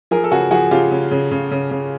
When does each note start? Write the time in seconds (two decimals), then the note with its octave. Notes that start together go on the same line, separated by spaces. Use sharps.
0.11 F3 G#4 A#4
0.24 A4
0.31 C#3 F#4 G#4
0.51 F3 F#4 G#4
0.71 C#3 F4 G4
0.91 C#3
1.11 C#3
1.31 C#3
1.51 C#3
1.71 C#3